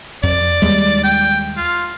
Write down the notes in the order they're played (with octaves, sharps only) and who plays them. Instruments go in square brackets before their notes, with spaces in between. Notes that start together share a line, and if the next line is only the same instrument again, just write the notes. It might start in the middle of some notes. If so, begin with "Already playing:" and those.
[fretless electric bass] F2 [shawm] D5
[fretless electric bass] D#2 G3 G#3
[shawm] G5
F4